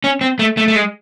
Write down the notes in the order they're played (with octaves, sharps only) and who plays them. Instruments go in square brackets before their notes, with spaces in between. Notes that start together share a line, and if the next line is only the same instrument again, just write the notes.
[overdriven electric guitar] C#4
C4
A3
A3
A3
G#3